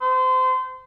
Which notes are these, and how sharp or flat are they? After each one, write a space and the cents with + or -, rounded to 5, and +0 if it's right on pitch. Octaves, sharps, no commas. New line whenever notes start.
C5 -30